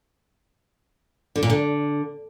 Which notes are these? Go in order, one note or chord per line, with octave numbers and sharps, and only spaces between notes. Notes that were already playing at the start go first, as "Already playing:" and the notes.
D3
A#2
D3